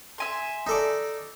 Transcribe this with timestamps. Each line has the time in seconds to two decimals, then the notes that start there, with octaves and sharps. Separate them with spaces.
0.18 E5 G#5 C6
0.67 D#4 A4 D5